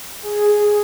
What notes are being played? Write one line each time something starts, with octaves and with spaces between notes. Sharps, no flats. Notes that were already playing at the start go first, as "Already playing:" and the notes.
G#4
G#4